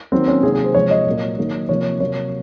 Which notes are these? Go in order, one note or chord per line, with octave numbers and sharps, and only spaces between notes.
D#3 F#3 A#3 C4
C#4
C3 D#3 F#3 A#3 G#4
G#4
C5
C3 F3 G#3 C#5
D#5
A#2 F#3 A#3
D#3 F#3 A#3
C3 F3 A#3 C#5
C3 F#3 A#3 C#5